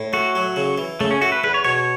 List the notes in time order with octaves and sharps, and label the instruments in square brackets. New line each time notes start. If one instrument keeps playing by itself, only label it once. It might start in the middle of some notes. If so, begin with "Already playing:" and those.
Already playing: [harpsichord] A2
[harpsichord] A3 [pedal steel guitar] F#4
[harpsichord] F#3
C#3
E3
[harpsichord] C#3 [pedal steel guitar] A3
[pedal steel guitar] C#4
[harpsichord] A3 [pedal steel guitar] F#4
[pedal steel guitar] B4
[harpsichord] E2 [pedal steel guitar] B4
[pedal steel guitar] C#5
[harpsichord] B2 [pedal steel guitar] C#5
[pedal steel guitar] C#5